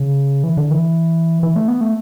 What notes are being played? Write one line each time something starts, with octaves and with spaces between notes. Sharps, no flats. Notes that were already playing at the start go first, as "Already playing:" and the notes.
Already playing: C#3
E3
D3
E3
E3
A3
B3
A3